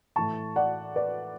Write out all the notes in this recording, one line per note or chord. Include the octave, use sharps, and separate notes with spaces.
A2 E3 A3 A5 C#6
D5 F#5
B4 D5